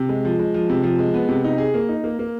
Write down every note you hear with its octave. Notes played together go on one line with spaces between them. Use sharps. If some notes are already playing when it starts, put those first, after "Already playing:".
Already playing: C3
G#3
F3
G#3
F3
C3
F3
G#3
B3
C3
D#4
G#4
A#3
D#4
A#3
A#3